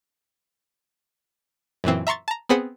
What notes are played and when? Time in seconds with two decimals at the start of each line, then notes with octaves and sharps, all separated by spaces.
1.84 F#2 A#2 E3 C4
2.07 E5 A#5 C6 C#6 A6
2.28 A5 A#5
2.49 B3 C4 G#4 B4 C5 F#5